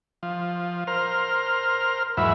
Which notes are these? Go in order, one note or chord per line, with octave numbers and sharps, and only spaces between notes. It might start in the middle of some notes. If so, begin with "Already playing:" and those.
F3
A#4 C5 F6
E2 G#2 F#3 E5 B5